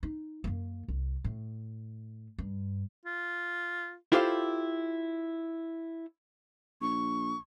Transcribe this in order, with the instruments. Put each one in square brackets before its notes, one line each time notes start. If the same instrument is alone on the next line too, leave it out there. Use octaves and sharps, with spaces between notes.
[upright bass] D#4
F#2 A#3
C2
A2
G2
[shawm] F4
[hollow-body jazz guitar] E4 F4 G4 A4 C5 F5
[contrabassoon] A#1 [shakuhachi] C#6